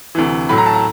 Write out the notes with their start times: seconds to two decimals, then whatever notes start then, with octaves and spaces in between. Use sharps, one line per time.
0.15 D2 C3 E3
0.49 A2 F#3 B5
0.58 A#5
0.66 A5
0.74 A#5